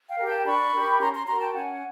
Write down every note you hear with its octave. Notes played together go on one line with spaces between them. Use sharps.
F5 G5
G4 A#4
G5 A5
D4 B5 C#6
G4 A#4
C#4 A#5 C6
A#5 C6
F#4 A#4 A#5 C6
G5 A5
C#4 F#5 G#5